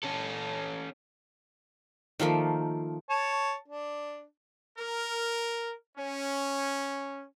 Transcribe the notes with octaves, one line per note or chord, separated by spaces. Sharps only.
C#4 A4
D#3 F3 A3 A#3
C#5 A5
D4
A#4
C#4